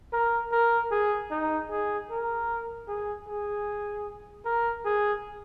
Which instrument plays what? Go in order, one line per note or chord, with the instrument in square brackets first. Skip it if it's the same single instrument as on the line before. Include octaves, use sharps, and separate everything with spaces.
[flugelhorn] A#4
A#4
G#4
D#4
G#4
A#4
G#4
G#4
A#4
G#4